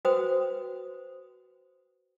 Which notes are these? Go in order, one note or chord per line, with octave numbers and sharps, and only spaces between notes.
F#4 B4 C5 G5 D#6